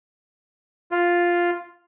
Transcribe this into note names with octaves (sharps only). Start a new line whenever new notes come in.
F4